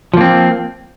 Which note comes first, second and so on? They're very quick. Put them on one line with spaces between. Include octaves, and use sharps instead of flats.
F3 A#3 C4